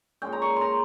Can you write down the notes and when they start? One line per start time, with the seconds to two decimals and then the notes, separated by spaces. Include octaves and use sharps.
0.22 A#2 G#3 C#4 G5
0.33 A#5
0.42 C#6
0.56 A#5 C6